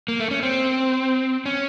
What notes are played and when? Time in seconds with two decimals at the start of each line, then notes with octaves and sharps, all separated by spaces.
0.08 A#3
0.20 A3
0.31 C#4
0.43 C4
1.46 C#4